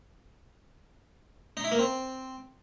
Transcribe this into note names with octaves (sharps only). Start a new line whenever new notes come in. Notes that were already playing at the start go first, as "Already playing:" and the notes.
D#4
E4
A#3
C4